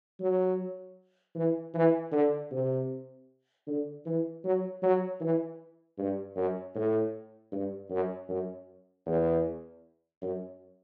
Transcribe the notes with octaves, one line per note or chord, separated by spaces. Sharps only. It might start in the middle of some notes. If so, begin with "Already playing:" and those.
F#3
E3
E3
D3
C3
D3
E3
F#3
F#3
E3
G2
F#2
A2
G2
F#2
F#2
E2
F#2